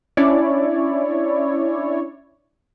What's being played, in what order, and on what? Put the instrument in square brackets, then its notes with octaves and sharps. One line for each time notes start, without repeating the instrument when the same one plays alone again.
[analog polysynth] C#4 D4 E4 C#5 D5